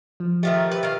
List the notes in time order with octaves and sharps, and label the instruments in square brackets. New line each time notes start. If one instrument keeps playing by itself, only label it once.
[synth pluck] F3
[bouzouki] D#3 F3 A3 [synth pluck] G4 E5
[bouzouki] B4
D#3 F5